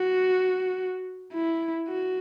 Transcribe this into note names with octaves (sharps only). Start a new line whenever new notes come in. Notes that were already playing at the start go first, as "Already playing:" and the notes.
Already playing: F#4
E4
F#4